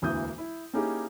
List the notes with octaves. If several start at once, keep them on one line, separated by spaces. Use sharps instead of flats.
E1 D2 E3 A#3 D#6 G6
E4
A#3 C#4 D#4 E4 G4 G#4